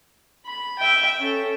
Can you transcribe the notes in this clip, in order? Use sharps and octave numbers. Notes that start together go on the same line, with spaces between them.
B5
E5 G5
C#4 A4